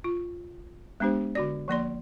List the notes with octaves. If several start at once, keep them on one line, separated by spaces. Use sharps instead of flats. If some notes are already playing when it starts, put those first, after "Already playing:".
F4
G#3 B3 D4 G4 C5
D3 F#4 D5
F3 A#3 D5 C6